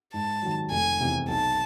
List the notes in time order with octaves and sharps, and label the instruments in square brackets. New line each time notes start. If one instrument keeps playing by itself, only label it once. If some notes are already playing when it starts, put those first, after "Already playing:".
[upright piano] G#2 [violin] A5
[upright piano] D#3 F#3
[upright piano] F1 [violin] G#5
[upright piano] E2 C3
[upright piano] B1 [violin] A5